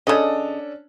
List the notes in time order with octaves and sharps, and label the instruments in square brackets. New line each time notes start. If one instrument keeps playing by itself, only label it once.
[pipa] C#3 D#5 [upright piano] C#4 D4 A4